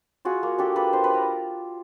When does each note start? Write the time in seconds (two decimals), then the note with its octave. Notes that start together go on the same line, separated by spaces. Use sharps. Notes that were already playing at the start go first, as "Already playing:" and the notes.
0.25 F4 F#4 G#4
0.43 A#3
0.58 D4 G4 A4
0.76 A#3 A4 B4
0.93 D4 C5
1.04 B4
1.09 D4 A#4